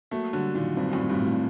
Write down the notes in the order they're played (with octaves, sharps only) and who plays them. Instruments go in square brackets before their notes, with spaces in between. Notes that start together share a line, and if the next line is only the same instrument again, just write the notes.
[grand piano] F#3 A3 [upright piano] A#3
[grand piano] D3 F#3 [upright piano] G3
[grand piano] A#2 D3 [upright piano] D#3
[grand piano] G2 [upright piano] C4
[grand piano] F#2 A2
[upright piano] G3
[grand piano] G2 A#2
[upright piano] A2
[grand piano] A#2